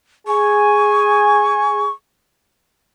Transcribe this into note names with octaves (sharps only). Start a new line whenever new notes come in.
G#4 G#5 C#6